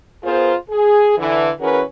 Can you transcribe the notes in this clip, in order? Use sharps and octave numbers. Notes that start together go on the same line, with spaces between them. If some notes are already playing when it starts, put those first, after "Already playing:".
B3 F4 G#4 A#4 C5
G#4
D3 E3
E3 C#4 F#4 G#4 A#4 B4